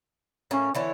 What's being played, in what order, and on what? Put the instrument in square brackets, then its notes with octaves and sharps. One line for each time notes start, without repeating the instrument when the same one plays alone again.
[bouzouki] A2 A#3 [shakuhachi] C#4
[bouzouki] D3 E3 E4 [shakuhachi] C#5